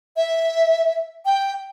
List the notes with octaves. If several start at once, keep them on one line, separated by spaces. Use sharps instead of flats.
E5
G5